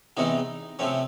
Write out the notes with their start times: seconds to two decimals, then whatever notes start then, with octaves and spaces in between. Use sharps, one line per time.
0.17 E2 C3 E3 G#3 C#4 D#4
0.79 C3 F3 A3 C4 C#4